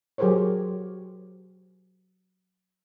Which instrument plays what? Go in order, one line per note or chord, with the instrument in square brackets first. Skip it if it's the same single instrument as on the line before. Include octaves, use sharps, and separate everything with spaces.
[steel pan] F#3 G4 G#4 A#4 C5 C#5